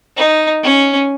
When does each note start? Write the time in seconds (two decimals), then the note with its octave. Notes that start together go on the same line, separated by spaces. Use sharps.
0.17 D#4
0.63 C#4